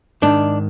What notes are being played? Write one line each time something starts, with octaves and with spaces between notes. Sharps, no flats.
G#2 D#3 D4